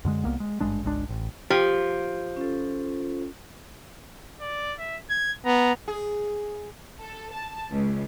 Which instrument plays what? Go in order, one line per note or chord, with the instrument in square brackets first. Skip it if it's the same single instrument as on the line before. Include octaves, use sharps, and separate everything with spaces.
[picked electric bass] F#2 D3 G#3
C2 A#3 B3
G#3
G#1 G2 G#3 D4
G#1 C#2 G#3 D4
A1
[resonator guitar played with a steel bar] F3 [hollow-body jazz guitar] G4
[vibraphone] C#4 F4 A4
[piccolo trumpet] D5
E5
G#6
[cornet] B3 [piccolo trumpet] A#5
[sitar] G#4
[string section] A4
A5
C#2